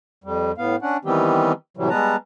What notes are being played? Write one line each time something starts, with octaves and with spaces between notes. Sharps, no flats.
F2 G3
A2 B3 F5
C#4 D4 F#5
D#3 E3 G3 B3 C4 G4
A2 C3 E3 F#3 G3
G3 G#3 B3 B4 A5 A#5